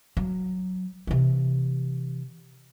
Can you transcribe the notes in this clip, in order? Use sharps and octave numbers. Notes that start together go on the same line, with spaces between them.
F#3
C3 E3